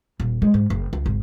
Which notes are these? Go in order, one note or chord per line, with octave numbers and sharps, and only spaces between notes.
D#1
G#3
G#2
F#1
C#2
G#1